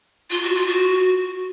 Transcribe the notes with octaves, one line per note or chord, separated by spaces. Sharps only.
F4
F#4
F4
F#4